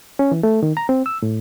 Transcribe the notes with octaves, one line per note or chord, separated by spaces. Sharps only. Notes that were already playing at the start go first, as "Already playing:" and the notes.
C#4
E3
A3
D#3
A#5
C4
E6
A2